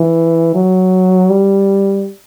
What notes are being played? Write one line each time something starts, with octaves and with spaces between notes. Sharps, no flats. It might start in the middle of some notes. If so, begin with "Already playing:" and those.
Already playing: E3
F#3
G3